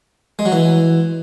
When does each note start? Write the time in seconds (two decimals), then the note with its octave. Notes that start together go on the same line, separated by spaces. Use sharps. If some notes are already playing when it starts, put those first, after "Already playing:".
0.39 G#3
0.46 F#3
0.52 E3